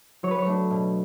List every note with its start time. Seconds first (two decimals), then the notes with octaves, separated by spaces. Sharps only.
0.23 F#3 C#5
0.31 B4
0.39 C#5
0.46 A3 D4
0.71 B2